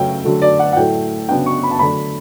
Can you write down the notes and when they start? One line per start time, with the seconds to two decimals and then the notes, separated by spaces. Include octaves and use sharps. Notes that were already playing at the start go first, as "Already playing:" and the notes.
Already playing: C#3 F#3 A3 C#4 G5
0.24 D3 F#3 A3
0.42 D5
0.59 F#5
0.73 F#5
0.77 A2 F#3 A3 G5
1.29 C#3 F#3 B3 D4 G5
1.46 C#6
1.63 B5
1.71 A5
1.79 D3 F#3 A3 D4 B5